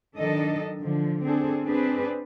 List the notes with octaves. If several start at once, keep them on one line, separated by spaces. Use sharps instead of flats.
D#3 F#3 D4 A4 D#5
D3 F3
C4 D4 G#4 A4
C4 D4 G#4 B4